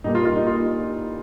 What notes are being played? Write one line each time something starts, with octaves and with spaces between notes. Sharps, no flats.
A#2 G3 A#3 D#4
F4
F4
D#4
F4